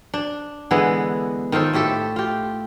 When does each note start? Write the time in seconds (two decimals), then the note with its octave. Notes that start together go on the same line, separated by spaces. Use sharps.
0.14 D4
0.71 D3 E3 G#3 B3
1.52 D#3 F4 A4 C5
1.73 A2 A3 G4 A4
2.16 F4 G4